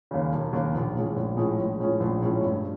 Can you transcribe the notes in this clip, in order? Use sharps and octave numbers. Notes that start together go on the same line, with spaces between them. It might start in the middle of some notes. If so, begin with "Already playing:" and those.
D#2 C#3
E1
D#2 C#3
A#1
A2 F3 G#3 C#4
A#1
A2 F3 G#3 C#4
A#1
A2 F3 G#3 C#4
A#1
A2 F3 G#3 C#4
G2